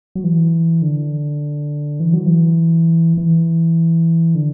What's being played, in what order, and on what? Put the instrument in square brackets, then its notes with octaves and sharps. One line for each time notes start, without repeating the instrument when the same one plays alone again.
[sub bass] F#3
E3
D3
E3
F#3
E3
E3
D3